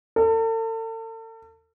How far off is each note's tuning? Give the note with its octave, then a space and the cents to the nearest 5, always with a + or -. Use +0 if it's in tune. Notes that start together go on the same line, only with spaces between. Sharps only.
A4 +40